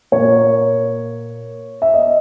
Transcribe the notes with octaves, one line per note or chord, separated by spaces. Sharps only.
A#2 A#3 C#5
E5
D#5